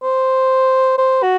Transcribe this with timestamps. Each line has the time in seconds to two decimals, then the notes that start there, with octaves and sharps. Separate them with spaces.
0.03 C5
0.98 C5
1.23 F#4